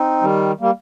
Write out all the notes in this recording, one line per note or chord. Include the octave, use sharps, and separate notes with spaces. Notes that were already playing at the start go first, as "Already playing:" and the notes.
Already playing: C4 D#4
D#3 G3
G3 A#3